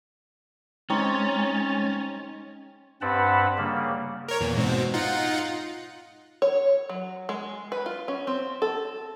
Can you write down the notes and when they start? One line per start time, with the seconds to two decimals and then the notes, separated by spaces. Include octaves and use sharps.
0.90 G#3 C4 C#4 D#4 C#5 G#5 A6
3.01 G2 C4 B4 F#5 A5 B5
3.58 C#3 G3 A#3
4.28 A#4 C#5
4.40 E2 A#2
4.56 G#2 B2 C4
4.94 D#4 F4 F#5
6.42 C#5
6.89 F#3
7.29 G#3
7.72 B4
7.86 F4
8.08 C#4
8.27 C4
8.62 A4